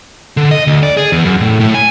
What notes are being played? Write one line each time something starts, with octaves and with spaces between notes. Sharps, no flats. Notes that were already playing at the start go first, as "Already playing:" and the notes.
D3
D#5
D2
D5
G#4
E2
F#2
A2
A2
G#5